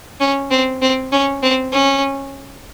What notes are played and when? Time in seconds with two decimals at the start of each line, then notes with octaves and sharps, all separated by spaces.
0.20 C#4
0.51 C4
0.82 C4
1.12 C#4
1.43 C4
1.72 C#4